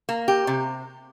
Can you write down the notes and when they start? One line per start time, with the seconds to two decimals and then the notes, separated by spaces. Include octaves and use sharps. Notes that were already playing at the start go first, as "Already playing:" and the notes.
0.09 A#3
0.28 G4
0.47 C3